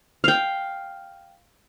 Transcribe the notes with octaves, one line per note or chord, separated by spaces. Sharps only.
F5 G5